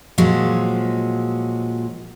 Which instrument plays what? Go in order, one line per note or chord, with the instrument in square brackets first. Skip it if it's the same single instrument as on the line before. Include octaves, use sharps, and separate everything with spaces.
[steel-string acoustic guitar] A#2 F3 F#3 G#3 F#4